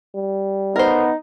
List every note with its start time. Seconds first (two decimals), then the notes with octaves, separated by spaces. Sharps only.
0.16 G3
0.76 B3 D#4 A#4 C5